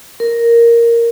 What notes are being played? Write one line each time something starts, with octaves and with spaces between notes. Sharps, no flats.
A#4